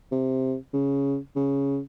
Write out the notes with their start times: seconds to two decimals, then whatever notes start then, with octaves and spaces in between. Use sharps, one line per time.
0.12 C3
0.73 C#3
1.36 C#3